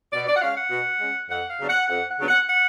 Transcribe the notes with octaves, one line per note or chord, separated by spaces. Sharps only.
B2 D5
D5
F#5
G#3 C#4 F5
F#5
B2
G#3 C#4
F2 F#5
F5
C#3 F#3 B3 D4
F#5
F2 F#5
F#5
C#3 F#3 B3 D4
F#5
F#5